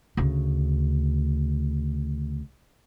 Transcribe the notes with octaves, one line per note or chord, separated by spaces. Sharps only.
D2 C#3